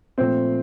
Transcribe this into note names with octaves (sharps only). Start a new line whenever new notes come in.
A#2 F3 A3 C4 C5